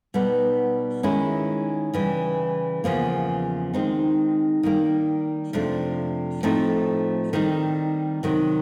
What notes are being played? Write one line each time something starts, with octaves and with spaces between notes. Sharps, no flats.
B2 G3 B3 D#4
D#3 G#3 C#4 E4
C#3 E3 G3
E2 C#3 F3 A#3
D#3 G#3 C4 D#4
D#3 G3 A#3
F2 C3 F3 A3 D4
A2 F3 A3 C4 D#4
D#3 G3 C4 D#4
C3 D#3 F#3